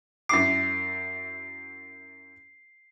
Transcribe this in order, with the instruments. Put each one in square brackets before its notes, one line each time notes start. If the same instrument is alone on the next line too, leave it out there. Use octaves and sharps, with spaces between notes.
[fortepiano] F#2 E4 D6 [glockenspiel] C7